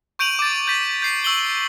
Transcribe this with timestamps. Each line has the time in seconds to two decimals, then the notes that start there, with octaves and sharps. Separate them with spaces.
0.19 C#6 G6 D7 D#7 F7 F#7
0.39 D6 A6
0.67 G6 A6 B6
1.02 G6 C7
1.24 C#6 E6 F#7 G7